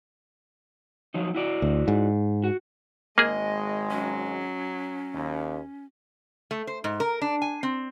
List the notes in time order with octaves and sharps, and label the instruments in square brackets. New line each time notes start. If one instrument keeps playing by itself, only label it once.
[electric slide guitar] F3 F#3 D#4
E4 F#4 D5
[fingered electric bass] D2
G#2
[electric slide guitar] F#4
[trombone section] G#1 G#3 [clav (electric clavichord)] A#3 G#4 [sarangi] D#5
[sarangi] F#3 [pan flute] C#4
[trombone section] D#2
[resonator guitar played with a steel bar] A3
C5
G#2
A#4
D4
G#5
C4